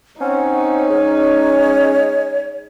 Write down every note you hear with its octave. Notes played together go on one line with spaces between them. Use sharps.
C4 C#4 D#4 F#5
G#3 C#5